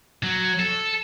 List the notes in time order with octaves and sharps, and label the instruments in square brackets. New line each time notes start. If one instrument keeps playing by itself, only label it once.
[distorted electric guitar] F#3
A4